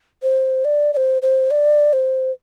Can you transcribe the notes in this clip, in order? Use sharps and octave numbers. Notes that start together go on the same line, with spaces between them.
C5
D5
D5
C5
C5
D5
C5